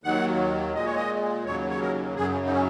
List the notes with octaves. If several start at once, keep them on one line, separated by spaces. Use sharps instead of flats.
D#2 D#3 F#3 F#5
A#2 G#3 D#5
C#5
D#5
D#2 C#3 F#3 C#5
C#5
A#4
F#2 C#3 F#3 G#4
D#4
C#4